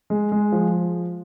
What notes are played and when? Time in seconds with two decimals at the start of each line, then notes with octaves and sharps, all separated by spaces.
0.10 G#3
0.32 G#3
0.52 F3